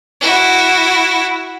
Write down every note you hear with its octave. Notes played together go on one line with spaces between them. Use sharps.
E4 F#4